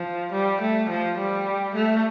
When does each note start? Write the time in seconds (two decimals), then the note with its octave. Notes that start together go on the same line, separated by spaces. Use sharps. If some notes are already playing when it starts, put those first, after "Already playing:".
Already playing: F3
0.32 G3
0.61 A3
0.90 F3
1.18 G3
1.75 A3